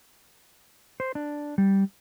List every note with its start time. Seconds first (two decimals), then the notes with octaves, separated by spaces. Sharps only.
1.00 C5
1.15 D4
1.58 G3